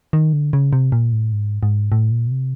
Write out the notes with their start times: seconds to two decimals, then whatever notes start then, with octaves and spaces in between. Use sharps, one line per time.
0.13 D#3
0.33 D3
0.53 C#3
0.73 C3
0.92 A#2
1.13 A2
1.33 G#2
1.63 G#2
1.92 A2
2.11 A#2
2.27 B2
2.32 C3